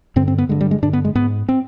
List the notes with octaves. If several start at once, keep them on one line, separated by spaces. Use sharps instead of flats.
G2 D3 C4
C4
B3
G2 D3 G#3
G3
G#3
G2 D3 D4
B3
G#3
G#2 B3
C4